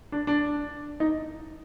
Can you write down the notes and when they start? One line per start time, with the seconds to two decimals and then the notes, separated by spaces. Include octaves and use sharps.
0.12 D4
0.27 D4
1.00 D#4